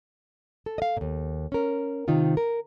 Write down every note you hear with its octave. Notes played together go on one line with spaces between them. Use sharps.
A4
D#5 F5
D#2 A#2
C#4 A#4
C3 D#3 D#4 F4
A#4